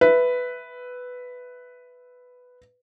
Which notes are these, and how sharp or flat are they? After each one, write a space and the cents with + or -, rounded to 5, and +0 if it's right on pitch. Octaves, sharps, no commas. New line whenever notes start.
B4 +5 E5 +0